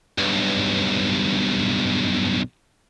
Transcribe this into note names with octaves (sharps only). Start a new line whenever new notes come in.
B1 G2